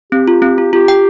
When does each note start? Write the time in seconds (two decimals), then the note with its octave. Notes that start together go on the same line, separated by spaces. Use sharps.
0.12 C4 G4
0.28 F4
0.42 C4
0.58 F4
0.73 F4 G4
0.88 G5